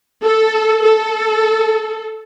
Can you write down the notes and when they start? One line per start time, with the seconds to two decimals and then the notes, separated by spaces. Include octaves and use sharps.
0.22 A4
0.82 A4